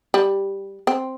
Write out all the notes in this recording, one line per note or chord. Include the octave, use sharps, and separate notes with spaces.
G3
C4